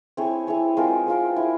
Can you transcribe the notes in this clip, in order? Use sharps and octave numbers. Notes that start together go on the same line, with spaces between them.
C4 E4 G#4 C#5
C4 E4 G#4 C#5
G#3 C4 F4 A#4
G#3 C4 F4 A#4
E4 G#4 C5 E5